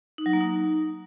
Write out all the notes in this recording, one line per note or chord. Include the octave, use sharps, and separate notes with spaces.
D#4
F#3
A#3
D#4